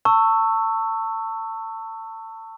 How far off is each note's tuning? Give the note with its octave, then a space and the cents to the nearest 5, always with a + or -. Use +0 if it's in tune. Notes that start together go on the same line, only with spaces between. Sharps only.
A5 +30 C#6 +0 E6 +0